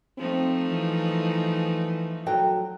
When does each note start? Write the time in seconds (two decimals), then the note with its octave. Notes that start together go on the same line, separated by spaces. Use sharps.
0.17 F3 A3 C4 D#4
0.68 E3
2.26 F#3 A4 G5